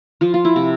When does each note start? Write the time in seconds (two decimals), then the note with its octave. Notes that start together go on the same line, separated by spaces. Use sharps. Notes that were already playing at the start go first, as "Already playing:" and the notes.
0.21 F3 F4
0.34 F4
0.45 E4
0.56 C3